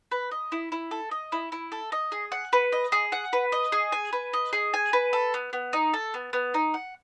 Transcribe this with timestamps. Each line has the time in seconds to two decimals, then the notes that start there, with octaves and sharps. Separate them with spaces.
0.12 B4
0.31 D#5
0.52 E4
0.72 E4
0.91 A4
1.11 D#5
1.32 E4
1.52 E4
1.72 A4
1.92 D#5
2.12 G#4
2.32 F#5
2.53 B4
2.72 D#5
2.92 G#4
3.12 F#5
3.33 B4
3.52 D#5
3.72 G#4
3.92 G#5
4.13 B4
4.33 D#5
4.53 G#4
4.74 G#5
4.93 B4
5.13 A4
5.34 B3
5.53 B3
5.73 D#4
5.94 A4
6.14 B3
6.33 B3
6.54 D#4
6.74 F#5